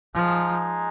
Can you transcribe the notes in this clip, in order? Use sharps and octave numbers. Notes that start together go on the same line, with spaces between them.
F3 G#3 D#4 G#4